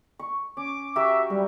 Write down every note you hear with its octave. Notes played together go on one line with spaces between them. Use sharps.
C#6
C#4 D6
F#4 G4 A#4 E5
G3 A#4